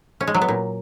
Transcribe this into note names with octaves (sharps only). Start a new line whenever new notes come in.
C#4
G#3
F#3
B3
A#2